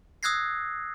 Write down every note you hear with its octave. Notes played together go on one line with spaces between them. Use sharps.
D#6 E6 F#6 G#6 A#6 C7